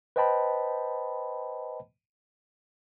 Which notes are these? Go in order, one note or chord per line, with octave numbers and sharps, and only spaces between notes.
B4 C5 D#5 G5 A5 B5